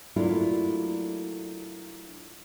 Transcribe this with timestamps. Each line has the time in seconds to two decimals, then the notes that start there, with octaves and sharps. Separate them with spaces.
0.16 F#3 A3 A#3 D4 E4 F4